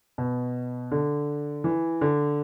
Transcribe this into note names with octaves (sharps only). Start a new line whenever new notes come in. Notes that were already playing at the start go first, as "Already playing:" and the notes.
B2
D3
E3
D3